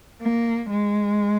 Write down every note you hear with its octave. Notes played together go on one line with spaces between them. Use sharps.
A#3
G#3